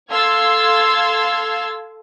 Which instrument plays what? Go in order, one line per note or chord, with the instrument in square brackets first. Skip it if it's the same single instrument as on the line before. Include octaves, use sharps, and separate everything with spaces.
[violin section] A4 F5 C6 E6 G#6 A6